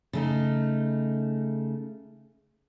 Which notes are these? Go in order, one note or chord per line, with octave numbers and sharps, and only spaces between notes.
C#3 A3 D#4